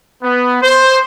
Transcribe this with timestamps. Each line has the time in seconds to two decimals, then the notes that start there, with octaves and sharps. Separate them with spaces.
0.23 B3
0.62 C5